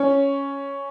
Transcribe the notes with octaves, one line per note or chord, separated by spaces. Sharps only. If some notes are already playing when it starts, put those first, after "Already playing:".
Already playing: C#4